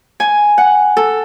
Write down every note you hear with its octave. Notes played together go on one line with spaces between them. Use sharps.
G#5
F#5
A4